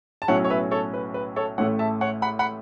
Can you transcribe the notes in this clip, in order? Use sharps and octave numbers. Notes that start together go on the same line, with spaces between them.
A5
B1 A2 F#3 C#4 E4 C#5 F#5
C#5
B4 E5
A4 C#5
B4
B4
A4 C#5
A1 A2 A3 E4 C#5 F#5
E5 A5
C#5 F#5
F#5 B5
F#5 B5